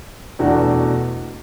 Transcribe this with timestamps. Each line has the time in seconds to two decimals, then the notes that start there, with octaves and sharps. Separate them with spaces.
0.39 E2 B2 A3 D4 F#4